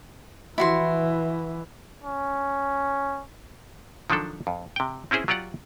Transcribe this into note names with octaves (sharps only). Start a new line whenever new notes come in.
E3 E4 F#4 C6
C#4
D#3 F3 F#3 D4 A4
F2
C3 G5
C4 C#4 E4 G#4 C5
F#3 F4 G4 D5 F#5